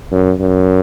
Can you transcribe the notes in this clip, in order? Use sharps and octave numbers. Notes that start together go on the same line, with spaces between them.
F#2
F#2